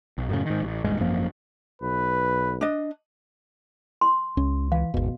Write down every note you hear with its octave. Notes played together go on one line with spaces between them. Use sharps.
B1
F#2 A2 C#3
G#2 D#3
A1
D#1 G#1 G2 G#3
G#1 F#2 F3 A#3
B1 B4
D4 D#5
C6
C#2 C#4
E3 F5
G#1 E2 B2